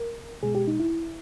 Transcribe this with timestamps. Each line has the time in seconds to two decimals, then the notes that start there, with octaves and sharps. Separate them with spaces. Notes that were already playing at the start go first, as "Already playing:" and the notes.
Already playing: A#4
0.43 B2 G#3 G#4
0.55 G4
0.67 D#4
0.80 E4